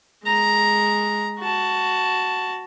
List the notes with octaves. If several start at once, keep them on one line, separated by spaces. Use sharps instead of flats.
G#3 A#5
F#4 A5